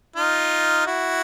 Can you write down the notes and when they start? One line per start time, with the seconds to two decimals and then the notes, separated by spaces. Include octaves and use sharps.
0.16 D#4 F4
0.86 E4 F#4